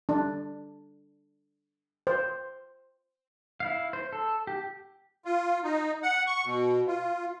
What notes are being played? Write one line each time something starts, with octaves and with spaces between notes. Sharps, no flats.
D4
C5
E4 F5
C5
A4
G4
F4
D#4
F#5
C#6
B2
F4